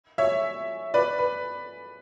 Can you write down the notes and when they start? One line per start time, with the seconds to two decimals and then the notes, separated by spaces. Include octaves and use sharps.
0.18 C#5 E5
0.94 B4 D5
1.19 B4